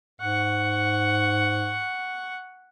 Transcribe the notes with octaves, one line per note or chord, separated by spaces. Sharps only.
G#2 F#5 C#6